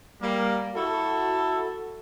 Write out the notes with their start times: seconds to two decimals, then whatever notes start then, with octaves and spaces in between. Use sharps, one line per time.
0.21 G3 A#3
0.75 E4 F#4 A4